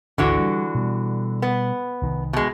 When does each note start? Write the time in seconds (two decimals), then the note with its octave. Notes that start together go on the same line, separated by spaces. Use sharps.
0.18 G#1 D2 D3 E3 F#4
0.38 G3
0.75 B2 G3
1.42 B3
2.02 C2 D#3
2.33 B2 G#3